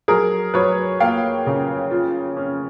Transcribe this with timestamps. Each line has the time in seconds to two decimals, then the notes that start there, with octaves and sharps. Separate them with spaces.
0.08 F#3 G#4 A#4
0.54 F#3 B4 C#5
1.00 A#3 F5 G5
1.46 C#3
1.91 F4
2.37 C#4